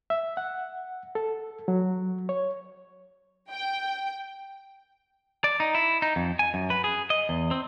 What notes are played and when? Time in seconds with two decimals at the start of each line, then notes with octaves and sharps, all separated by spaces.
0.10 E5
0.37 F#5
1.15 A4
1.68 F#3
2.29 C#5
3.52 G5
5.44 D5
5.60 D#4
5.75 E4
6.02 D#4
6.16 F2
6.39 G#5
6.54 F#2
6.70 B4
6.84 G#4
7.10 D#5
7.29 E2
7.51 C4